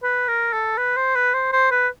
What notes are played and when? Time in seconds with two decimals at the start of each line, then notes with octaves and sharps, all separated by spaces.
0.03 B4
0.28 A#4
0.53 A4
0.78 B4
0.96 C5
1.15 B4
1.34 C5
1.52 C5
1.71 B4